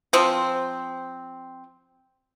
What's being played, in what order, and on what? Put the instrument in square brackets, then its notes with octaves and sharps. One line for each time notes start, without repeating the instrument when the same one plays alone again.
[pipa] F3 C4